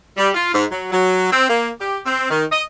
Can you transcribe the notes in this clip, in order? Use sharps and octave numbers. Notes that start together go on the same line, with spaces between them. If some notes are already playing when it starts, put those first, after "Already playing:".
G3
F4
G#2
F#3
F#3
C4
A#3
G4
C4
D#3
D#5